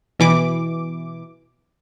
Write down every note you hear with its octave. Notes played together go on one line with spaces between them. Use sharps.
B2 E3 D6